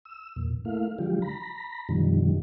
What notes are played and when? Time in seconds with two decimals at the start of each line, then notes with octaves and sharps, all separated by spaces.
0.05 E6
0.36 E2 A#2
0.65 A3 A#3 E4 F5
0.98 D3 F3 F#3 G#3 F4 G4
1.22 A#5 B5
1.89 F#2 B2 D3 D#3 F3 G3